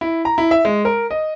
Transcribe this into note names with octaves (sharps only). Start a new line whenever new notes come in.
E4
A#5
E4
E5
G#3
A#4
D#5